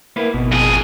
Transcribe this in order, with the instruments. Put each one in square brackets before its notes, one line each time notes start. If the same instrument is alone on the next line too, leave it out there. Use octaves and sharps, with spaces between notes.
[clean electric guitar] A#3 E4 B4
[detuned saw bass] G#1 [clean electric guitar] B2
[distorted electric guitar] F2 G#4